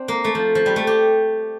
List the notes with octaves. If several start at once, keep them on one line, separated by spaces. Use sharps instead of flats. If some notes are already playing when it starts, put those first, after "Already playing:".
Already playing: C4 D4
A#3
A3
F3
F3
G3
A3
G4